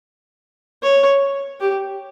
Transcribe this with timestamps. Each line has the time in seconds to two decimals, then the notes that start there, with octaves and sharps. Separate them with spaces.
0.83 C#5
1.61 G4